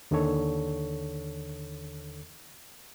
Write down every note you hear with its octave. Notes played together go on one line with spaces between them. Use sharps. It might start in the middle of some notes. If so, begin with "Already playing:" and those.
D#2 D3 D#3 A4 C#5